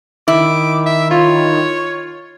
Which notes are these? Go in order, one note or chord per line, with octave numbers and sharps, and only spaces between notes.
D#3 E4 D6
E5
F4 C#5